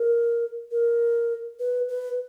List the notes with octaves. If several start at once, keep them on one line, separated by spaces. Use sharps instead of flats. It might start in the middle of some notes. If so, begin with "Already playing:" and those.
Already playing: A#4
A#4
B4
B4